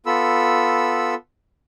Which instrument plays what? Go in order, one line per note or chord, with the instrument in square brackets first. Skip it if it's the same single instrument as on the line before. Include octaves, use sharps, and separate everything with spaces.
[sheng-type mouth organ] B3 F4 A4 B5 E6